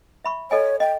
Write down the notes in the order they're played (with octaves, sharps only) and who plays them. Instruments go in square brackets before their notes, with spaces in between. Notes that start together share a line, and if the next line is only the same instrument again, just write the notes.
[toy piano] E5 B5 C#6
[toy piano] A4 D#5 G#5 [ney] C#5
[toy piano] D#5 [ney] G5